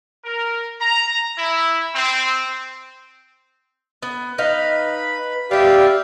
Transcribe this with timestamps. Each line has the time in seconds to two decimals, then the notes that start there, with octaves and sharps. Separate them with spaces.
0.25 A#4
0.81 A#5
1.38 E4
1.94 C4
4.03 B3
4.38 D#4 B4 F5
5.51 B3 G4 D5 E5 F5